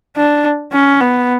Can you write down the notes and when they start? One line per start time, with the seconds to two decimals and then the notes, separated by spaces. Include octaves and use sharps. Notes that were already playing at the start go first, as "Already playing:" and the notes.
0.16 D4
0.72 C#4
1.01 B3